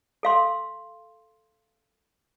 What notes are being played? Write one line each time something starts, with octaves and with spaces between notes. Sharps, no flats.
A4 F5 C6